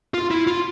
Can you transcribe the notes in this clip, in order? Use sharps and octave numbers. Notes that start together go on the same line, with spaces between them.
F4
E4
F4